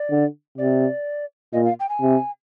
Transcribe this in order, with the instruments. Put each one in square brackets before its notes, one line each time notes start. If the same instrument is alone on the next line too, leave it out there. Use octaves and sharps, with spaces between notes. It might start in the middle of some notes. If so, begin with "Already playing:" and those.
Already playing: [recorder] D5
[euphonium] D3
[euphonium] C3 [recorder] D5
[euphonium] A#2 [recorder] D#5
[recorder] F5
G5
G#5
[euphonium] C3